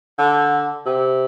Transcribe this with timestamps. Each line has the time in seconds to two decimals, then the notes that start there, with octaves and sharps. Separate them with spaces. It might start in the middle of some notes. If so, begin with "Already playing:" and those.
0.19 D3
0.86 C3